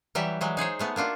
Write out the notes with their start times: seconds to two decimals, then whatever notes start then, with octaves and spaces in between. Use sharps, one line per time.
0.15 E3 F#3 G3 G4 E5
0.41 E3 F#3 G#3
0.57 D#4 G#4 C5 C#5
0.79 G#3 A3 B3
0.96 A#3 D4 F4 F#4